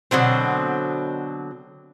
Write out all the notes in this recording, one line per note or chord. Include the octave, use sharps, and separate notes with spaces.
B2 D3 F#3 C4